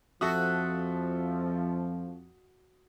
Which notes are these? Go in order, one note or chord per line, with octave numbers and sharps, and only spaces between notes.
F2 F3 F#4 A4 E5 D#6